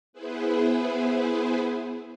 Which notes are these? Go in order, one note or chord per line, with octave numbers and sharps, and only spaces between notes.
B3 E4 G#4 B4 C5